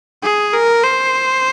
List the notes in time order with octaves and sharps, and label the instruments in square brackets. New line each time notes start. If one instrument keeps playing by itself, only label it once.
[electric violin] G#4
A#4
C5